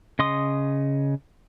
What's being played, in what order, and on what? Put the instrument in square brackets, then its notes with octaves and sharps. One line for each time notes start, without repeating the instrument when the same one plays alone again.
[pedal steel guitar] C#3 D#5 C6 D#6